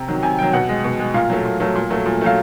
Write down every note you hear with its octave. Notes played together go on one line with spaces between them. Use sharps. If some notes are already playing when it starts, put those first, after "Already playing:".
Already playing: C3 A#5
D#3 F#3
C3 G#5
D#3 F#3 G5
B2 F#5
G#3
B2
G#3
A#2 F5
F#3 A3
A#2
F#3 A3
A#2
F#3 A3
A#2
F#3 A3 F5